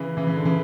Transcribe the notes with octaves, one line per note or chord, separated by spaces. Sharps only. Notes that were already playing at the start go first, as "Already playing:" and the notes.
Already playing: C#3 E3
C#3 E3
C#3
D3
C#3 E3